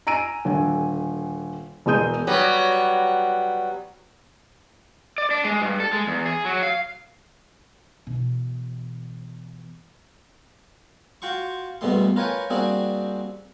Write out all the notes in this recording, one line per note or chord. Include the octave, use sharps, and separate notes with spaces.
G#5 A#5 E6 D7 D#7
D#1 D3 G#5
E1 B2 G#3 D#6 G6 D#7
F#3 G3 B3
D5
D4
G#3
G2
A4
G#3
E2
G#4
F#3
F5
B2 E3
F4 F#4 G5 C6 C#6
A#1 G2 B2 G3 A3 C6
F4 A#4 B4 C#5 G5 G#5
G3 A#3 C4 D4 F#4 G#4